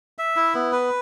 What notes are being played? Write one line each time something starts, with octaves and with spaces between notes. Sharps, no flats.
E5
E4
B3
B4